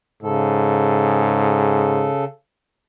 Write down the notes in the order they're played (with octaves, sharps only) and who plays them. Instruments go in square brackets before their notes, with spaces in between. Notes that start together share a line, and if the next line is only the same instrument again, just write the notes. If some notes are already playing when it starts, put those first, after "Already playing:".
[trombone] G#2 [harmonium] C#3 A4